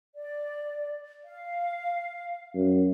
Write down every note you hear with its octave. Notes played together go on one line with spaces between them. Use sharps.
D5
F5
F#2